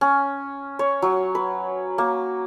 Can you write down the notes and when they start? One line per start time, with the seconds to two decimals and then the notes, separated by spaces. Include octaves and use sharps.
0.01 C#4
0.79 C#5
1.02 F#3
1.35 B4
1.98 A#3